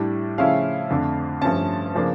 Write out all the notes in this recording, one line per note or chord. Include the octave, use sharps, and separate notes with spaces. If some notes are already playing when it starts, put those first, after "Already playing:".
Already playing: A2 G3 D4
C#3 F3 A3 C#4 E4 F5
F2 D3 A3 D4
G2 F3 A3 C#4 A5
C#3 F3 A#3 D4